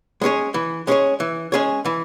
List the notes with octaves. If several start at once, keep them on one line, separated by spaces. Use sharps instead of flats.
G#3 C#4 G#4 C#5
E3
G#3 C#4 G#4 C#5
E3
G#3 C#4 G#4 C#5
E3